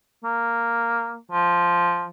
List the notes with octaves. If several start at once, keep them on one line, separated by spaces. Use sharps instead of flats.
A#3
F3